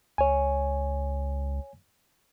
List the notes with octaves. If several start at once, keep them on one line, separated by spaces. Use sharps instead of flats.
C#2 C#5 G#5